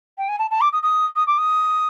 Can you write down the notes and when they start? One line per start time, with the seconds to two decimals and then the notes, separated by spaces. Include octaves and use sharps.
0.18 G5
0.28 G#5
0.39 A5
0.51 A5
0.61 D6
0.72 D#6
0.83 D#6
1.16 D#6
1.27 D6
1.38 D#6